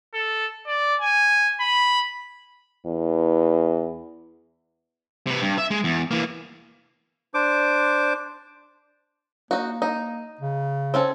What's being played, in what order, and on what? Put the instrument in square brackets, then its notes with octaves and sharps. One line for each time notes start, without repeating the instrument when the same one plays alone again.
[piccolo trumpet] A4
D5
G#5
B5
[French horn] E2
[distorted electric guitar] C3 B4
G2
E5
G#3
E2
E3 A#3
[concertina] D4 C5 D6
[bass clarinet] A#3 [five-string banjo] D#4 F#4
[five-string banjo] D#4
[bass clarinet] C#3
[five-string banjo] C4 C#4 A4